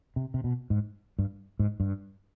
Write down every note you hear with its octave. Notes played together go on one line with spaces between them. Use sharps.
C3
C3
B2
G#2
G2
G#2
G2